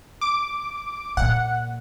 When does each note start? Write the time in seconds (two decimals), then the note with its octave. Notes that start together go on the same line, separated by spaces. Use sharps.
0.21 D6
1.17 A#2 F#5